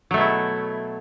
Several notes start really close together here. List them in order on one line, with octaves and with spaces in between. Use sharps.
F#3 A3 B2 E4